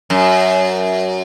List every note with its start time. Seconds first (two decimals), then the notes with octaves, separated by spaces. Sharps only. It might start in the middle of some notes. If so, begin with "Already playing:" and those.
0.10 F#2